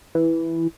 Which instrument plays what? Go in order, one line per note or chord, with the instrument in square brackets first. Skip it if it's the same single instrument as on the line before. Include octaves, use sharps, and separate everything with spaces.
[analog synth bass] E3